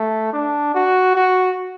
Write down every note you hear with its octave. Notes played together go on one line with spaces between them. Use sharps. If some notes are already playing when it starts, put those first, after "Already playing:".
Already playing: A3
D4
F#4
F#4